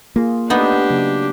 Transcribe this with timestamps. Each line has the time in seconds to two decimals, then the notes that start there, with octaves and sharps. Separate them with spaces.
0.16 A#3 F4 G#4
0.50 A3 B3 D4 D#4 G4 D#5
0.90 C#3 F#3 A#3